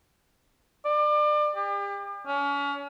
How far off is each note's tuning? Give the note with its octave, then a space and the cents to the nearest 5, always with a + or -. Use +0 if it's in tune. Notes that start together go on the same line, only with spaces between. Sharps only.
D5 +30
G4 +40
C#4 +35